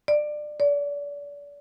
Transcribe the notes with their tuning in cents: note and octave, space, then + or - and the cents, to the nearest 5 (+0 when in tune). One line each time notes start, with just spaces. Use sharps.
D5 +25
D5 -35